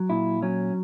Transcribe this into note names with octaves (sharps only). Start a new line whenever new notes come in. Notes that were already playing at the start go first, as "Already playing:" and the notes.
Already playing: F#3
A#2 E4
F#3 C#4